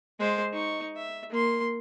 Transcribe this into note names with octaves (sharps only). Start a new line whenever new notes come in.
G#3 C5
D#4 C#6
E5
A#3 C6